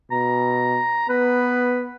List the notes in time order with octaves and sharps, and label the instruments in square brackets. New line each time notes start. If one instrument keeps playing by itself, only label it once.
[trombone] B2 [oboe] A#5
[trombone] B3 [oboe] B4